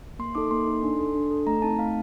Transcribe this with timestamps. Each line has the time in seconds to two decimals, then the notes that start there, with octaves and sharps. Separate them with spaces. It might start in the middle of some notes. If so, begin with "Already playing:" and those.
0.19 A#3 C6
0.35 D#4 A4 D6
0.51 A#3 C6
0.67 D#4 A4
0.83 D4
0.99 A4
1.15 D4
1.31 A4
1.47 A3 A#5
1.62 C4 D#4 A5
1.78 A3 F5